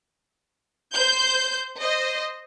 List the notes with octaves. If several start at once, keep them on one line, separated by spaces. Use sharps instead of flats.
C5 G6
C5 D#5